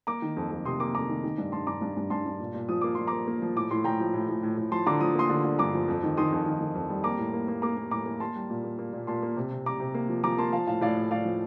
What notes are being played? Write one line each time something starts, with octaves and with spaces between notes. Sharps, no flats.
A#3 A#5 D6
D#3
F2
F2
C3 C6 D#6
A#3 A#5 D6
F2 A#5 D6
D#3
D#3
G2
G2 A5 C6
G2 A#5 D6
G2
G2
G2 A5 C6
G2
A#2
A#2
F3 D#6
A#3 D6
F3 C6
A#3 A#5 D6
A#3
F3
A2 D6
A2 C6
A2 G5 A#5
F3
A2
A2
A2
A2
F3 A5 C6
D3 A#5 D6
F3 D#6
A#3 C6 D#6
D3
D3
G2 A#5 D6
F3
F2
D#3
D#3 C6 D#6
F2
D#3
D#3
F2
G3
A#3 A#5 D6
A2
A#3
A#3
A#3 A#5 D6
A#3
A2 A#5 D6
A#3
A#3 A5 C6
G3
A#2
A#3
A#3
A#2
A#2 A5 C6
A#3
C3
C3
C3 A#5 D6
C3
A#3
F3
F3 A#5 D6
A#3 A5 C6
F3 F5 A5
A2 F5 A5
A2 D5 F5
A2
A2 D5 F5
F3